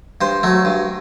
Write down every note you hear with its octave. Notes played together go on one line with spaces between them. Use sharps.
G2 C5
F#3 A3
G2